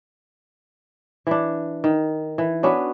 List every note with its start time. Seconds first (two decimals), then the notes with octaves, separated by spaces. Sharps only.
1.27 E3 D4
1.84 D#3
2.38 E3
2.63 B3 C#4 D4 F#4